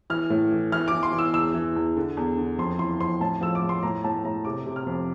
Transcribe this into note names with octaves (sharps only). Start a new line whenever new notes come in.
E3 F6
A2
E3
E3 F6
E3 D6
C6
E3
E6
E2 E6
E3
E2
D3
E2
D3
F2 C6
E3 C6
F2 C6
A2 A5
F3 E6
D6
A2
C6
A2 A#5
A2 A5
A2 A#5
C3 D6
C3
F6
F2